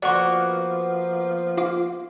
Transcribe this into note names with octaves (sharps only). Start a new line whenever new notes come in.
F3 A#3 B3 F#4 D5 F#5 C#6
F4 F5 D6